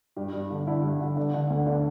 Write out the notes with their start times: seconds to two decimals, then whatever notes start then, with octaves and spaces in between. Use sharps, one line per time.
0.16 G2 G4
0.33 G2
0.50 D3
0.67 D3 E4
0.83 G2
1.01 D3
1.17 D3
1.34 D3
1.50 D2
1.67 D3 D4